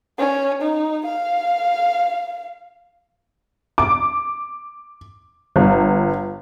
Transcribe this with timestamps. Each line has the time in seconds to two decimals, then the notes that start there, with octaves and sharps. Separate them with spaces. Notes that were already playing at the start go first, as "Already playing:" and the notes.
0.19 C#4
0.61 D#4
1.06 F5
3.78 D6
5.56 G1